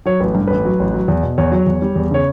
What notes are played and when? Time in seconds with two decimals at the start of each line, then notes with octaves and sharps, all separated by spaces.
0.06 F#3 C#5
0.20 A1 B4
0.35 G2
0.47 A1 B4
0.65 F#3
0.80 A1
0.94 F#3
1.08 E2
1.23 B2
1.38 E2 C#5
1.52 F#3
1.66 E2
1.82 G3
1.96 E2
2.11 C#3 C#5